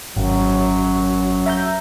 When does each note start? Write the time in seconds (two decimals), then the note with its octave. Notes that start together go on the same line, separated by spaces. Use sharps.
0.17 G#1 F#2 F#3
1.46 E5 A#5 G6